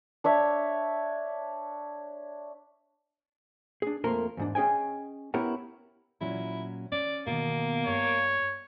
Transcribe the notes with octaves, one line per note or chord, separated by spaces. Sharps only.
D4 C#5 E5
D4 G#4
F2 A3 A#3 A#4 C6
E2 G#2 D4
C#4 G#4 D#5 G5 G#5
B3 C#4 E4 G4 A#4 F#5
A#2 F#3 C#4 E4
C#4 D5
B2 D#3 A#3
G2 C#5